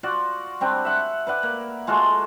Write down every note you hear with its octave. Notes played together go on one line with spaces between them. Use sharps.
F4 F#4 D5
G3 C4 D4
E5 F#5 C#6
B4 D5 F#5
A#3
G#3 F4 F#4 A4